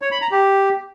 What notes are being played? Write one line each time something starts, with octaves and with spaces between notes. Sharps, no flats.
C#5
B5
A#5
G4